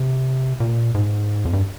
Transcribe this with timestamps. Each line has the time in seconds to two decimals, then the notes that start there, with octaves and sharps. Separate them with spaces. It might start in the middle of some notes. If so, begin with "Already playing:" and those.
Already playing: C3
0.60 A#2
0.95 G#2
1.45 F2
1.53 G2